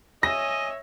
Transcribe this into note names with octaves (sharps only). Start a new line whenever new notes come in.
C#5 D#5 E5 G#5 A#6